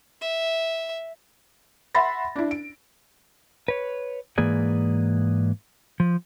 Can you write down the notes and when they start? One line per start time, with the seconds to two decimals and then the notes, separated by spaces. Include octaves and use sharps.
0.21 E5
1.95 E5 F#5 B5 C6 A6 A#6
2.36 D4 E4
2.51 D7
3.68 B4 C#5
4.38 G#2 E3 A#3 G#4 B4 D5
6.00 F3